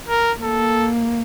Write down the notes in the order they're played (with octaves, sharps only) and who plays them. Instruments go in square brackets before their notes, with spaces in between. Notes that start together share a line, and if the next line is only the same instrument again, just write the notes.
[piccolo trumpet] A#4
[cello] A#3 [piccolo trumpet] A4